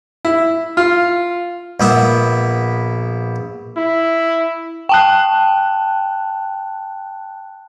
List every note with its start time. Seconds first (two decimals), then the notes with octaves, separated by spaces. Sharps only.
0.25 E4
0.77 F4
1.80 A#1 B3 E5
3.77 E4
4.89 G5 A5 F#6